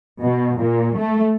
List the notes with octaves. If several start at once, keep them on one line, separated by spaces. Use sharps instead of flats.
B2
A#2
A3